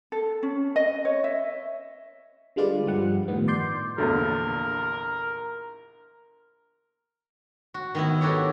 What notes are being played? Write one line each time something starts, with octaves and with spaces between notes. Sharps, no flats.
A4
C#4
D#5
C#5
E5
D3 G3 G#3 F4 B4 D5
G2 F3 G3 F#5
A2 D#3 B3
D5 C6 G6
A#1 E2 D3 A#4
F#4
D#3 B3 E4
D#4 F#4 G4 A4 C#5